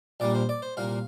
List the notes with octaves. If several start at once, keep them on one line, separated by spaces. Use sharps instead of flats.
A#1 A#2 G3 A#3 D5
C5
D5
C5
C2 A#2 A#3 F5